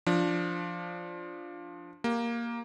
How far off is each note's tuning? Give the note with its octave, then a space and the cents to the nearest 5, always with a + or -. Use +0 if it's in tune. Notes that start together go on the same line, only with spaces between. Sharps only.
F3 -5 D4 +0
A#3 +5 G4 +0